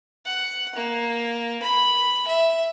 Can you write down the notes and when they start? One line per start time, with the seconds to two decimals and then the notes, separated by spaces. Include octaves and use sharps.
0.25 F#5
0.75 A#3
1.62 B5
2.27 E5